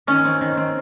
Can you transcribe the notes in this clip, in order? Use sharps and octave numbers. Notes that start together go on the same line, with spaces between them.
D#3 C#4
C4
D#3
C4